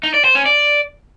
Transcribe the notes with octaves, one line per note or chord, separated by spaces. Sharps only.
D#4
D5
C5
C#4
D5